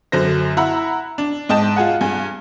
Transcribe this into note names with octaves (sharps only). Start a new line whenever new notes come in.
F#2 D3 C5 A#6
E4 F#5 A#5 B5 E6
D4
G#2 D#5 G5 A5
F4 G#4 F#5
G2 G#5